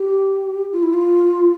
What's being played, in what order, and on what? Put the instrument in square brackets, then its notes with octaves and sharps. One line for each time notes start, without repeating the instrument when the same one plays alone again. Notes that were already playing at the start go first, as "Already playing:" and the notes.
Already playing: [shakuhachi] G4
F4
E4
F4